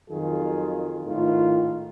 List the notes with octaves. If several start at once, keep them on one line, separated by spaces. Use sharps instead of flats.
F2 D#3 F#3 F4 G#4
G#1 A2 D#3 F4